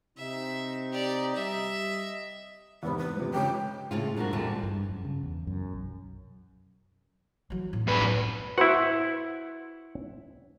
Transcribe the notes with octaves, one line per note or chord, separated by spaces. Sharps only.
C3 C4 D#4 E5
G4 D5
G3 G4 D#5 E5
E2 G#2 C3 B3
B4
C3 F3
C#3 G#3 G5
A2 C#3 F4
G2 A#2 F3 A#3 F#4
E2 A#2 D3 G3 F4 A5
G2
F#2
C#3
E2
F#2
B1
E3 F#3
A2
F#2 B4
E2 F#3
E4 F#4 B4 C5 F#5